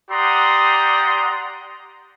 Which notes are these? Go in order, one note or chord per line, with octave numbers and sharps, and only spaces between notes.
G4 D5 F#5 A#5 C6 D#6